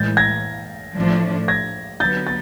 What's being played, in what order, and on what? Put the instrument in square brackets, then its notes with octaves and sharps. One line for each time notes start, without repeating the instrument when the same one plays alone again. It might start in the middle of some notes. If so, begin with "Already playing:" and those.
Already playing: [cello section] A2 E3 G#3 [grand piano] G6 A6
[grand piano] G#6 A#6
[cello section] A2 F3 A3 D4
[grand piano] G#6 A#6
[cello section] D3 F#3 B3 [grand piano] G6 A6
[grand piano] A6